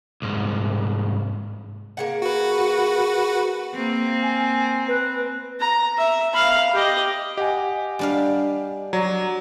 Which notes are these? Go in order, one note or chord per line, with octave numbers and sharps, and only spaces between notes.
C2 G#2
A#3 G#4 F#5
F#4 B4
A#3 C4
G#5
B4
A#5
E5
F5 B5
G4 D#5
G4 D#5 F#5 G#5
G3 D4 F5
F#3 D5 A#5